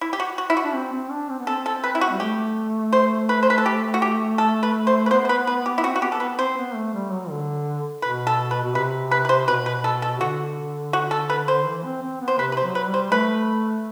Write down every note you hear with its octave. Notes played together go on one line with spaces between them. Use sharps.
E4
G4
F#4
F#4
E4
F#4
D4
C4
C4
D4
C4
B3
A4
C4
A4
B4
E4
F#4
G3
A3 G4
C5
B4
C5
B4
A4
G4
F#4
G4
A4
B4
C5
B4
B3 C5
C5
B4
B4
G4
E4
C4 F#4
F#4
B3 G4
A4
B3 B4
C4 C5
B3
A3
G3
F#3
D3
B2 B4
A4
B4
B2
C3 B4
B4
B4
C5
B2 B4
B4
A4
A4
D3 F#4
F#4
A4
B4
C5
E3
C4
C4
B3
C5
C3 B4
B4
C5
F#3
B4
G3
C5
A3 B4